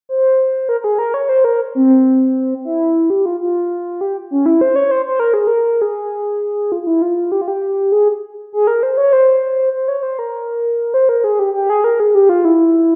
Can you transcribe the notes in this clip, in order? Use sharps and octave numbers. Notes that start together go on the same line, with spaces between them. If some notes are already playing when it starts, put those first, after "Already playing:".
C5
A#4
A#4
G#4
A#4
C#5
C5
A#4
C4
E4
G4
F4
F4
G4
C#4
E4
C5
C#5
C5
C5
A#4
G#4
A#4
G#4
F4
F4
E4
F4
G4
F4
G4
G#4
G#4
A#4
C5
C#5
C5
C5
C#5
C5
A#4
C5
A#4
G#4
G4
G4
G#4
A#4
G#4
G4
F4
E4